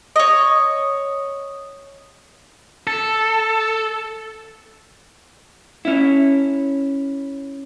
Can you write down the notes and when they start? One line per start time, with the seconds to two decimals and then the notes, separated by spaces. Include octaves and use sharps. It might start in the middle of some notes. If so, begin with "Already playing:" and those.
0.16 C#5 D#5
2.87 A4
5.85 C#4 E4